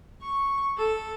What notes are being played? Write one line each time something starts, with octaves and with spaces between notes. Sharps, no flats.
C#6
A4